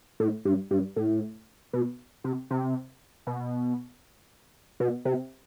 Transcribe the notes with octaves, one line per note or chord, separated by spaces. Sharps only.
A2
G2
G2
A2
B2
C3
C3
B2
B2
C3